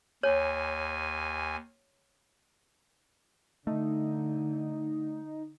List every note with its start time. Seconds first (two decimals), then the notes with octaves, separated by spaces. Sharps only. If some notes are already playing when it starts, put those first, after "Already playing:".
0.23 D#2 C#5 G#5
3.67 D3 A3 D#4